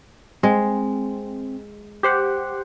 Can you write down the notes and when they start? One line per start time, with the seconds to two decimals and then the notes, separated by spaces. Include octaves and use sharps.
0.43 G#3 C4
2.03 G4 C5 F#5